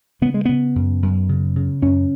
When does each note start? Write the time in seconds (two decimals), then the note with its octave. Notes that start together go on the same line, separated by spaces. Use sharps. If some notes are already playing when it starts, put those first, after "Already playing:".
0.21 C#3 B3
0.34 G#3
0.45 C#3 B3
0.76 F#2
1.03 F#2
1.29 C#3
1.56 C#3
1.82 F#2 C#4